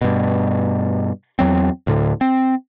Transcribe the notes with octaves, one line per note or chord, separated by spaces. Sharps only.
G2 B2
E2 F#3 C4
D2 A2 D3
C4